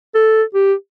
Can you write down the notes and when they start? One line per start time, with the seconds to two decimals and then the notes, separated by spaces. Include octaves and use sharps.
0.15 A4
0.55 G4